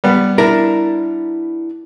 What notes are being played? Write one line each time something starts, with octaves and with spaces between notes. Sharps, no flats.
G3 B3
D4 E4 A#4